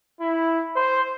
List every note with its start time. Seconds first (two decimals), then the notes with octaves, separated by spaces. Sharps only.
0.21 E4
0.76 C5